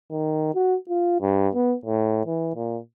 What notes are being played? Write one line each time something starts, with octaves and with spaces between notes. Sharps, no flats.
D#3
F#4
F4
G2
B3
A2
E3
A#2